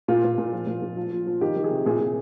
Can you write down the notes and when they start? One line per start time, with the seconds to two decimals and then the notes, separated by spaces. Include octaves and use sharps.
0.08 A#2 F4
0.24 A#2
0.38 A#2
0.53 F3
0.67 A#2
0.82 A#2
0.97 F3
1.12 F3
1.26 F3
1.41 D#3 G4
1.56 D#3
1.64 G#4
1.71 C3
1.86 A#2 G#4
2.00 A#2